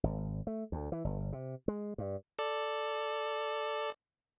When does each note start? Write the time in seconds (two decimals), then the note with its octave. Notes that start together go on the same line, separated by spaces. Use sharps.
0.03 G#1
0.47 A3
0.72 D2
0.92 E3
1.05 G1
1.33 C3
1.68 G#3
1.98 G2
2.39 A4 D5